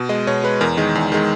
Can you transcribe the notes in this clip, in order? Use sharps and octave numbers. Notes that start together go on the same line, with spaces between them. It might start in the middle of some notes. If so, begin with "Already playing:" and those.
Already playing: B2
G#3 D#5
B2 C#5
G#3 B4
E2 A#4
D#3 G#3
E2
D#3 G#3